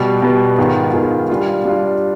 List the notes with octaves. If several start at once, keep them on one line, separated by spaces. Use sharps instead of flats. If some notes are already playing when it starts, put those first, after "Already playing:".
Already playing: B2 G3 B3
B2 G3 B3
G#2 D#3 B3 F4 G#4
G#2 D#3 B3 F4 G#4
G3 D4 F4
G3 D4 F4